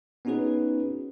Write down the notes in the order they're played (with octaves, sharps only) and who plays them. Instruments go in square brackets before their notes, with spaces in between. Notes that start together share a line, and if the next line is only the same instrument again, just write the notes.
[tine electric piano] B3 C#4 D#4 F#4 G#4 B4